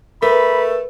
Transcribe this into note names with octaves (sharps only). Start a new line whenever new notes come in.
A3 A#4 B4 B5